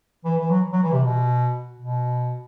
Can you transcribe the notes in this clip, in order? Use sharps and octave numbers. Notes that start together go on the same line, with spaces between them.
E3
E3
F#3
F#3
E3
C3
B2
B2